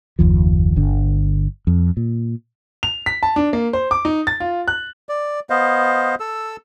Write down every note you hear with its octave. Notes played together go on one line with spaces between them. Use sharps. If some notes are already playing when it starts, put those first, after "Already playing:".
F#1 D#2 F3
G1 D3
F2
A#2
F7
B6
A5
D4
A#3
C5
D6
D#4
A6
F4
F#6
D5
B3 C5 D#5 F5
A4 E6